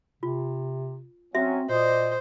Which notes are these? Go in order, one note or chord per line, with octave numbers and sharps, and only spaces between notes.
C3 F4
F#3 C4 C#4 F#4 E5
A#2 C5 D5 D#5